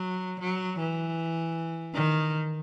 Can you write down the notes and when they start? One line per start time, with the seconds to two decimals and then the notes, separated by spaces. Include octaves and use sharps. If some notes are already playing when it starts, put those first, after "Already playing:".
Already playing: F#3
0.40 F#3
0.79 E3
1.94 D#3